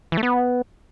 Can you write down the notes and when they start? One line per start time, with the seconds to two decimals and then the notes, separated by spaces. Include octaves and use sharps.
0.12 E3
0.17 A3
0.23 B3